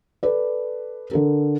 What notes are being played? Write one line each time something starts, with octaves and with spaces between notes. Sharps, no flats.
A4 B4 D5
D3 A4 A#4